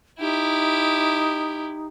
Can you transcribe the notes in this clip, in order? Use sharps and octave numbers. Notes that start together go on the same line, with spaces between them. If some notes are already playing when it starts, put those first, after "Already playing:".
D#4 E4 G4